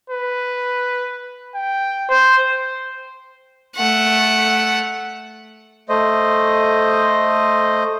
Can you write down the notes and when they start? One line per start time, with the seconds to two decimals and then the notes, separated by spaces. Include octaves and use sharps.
0.10 B4
1.55 G5
2.10 C5
3.76 A3 F#5
5.89 A3 C5 D#5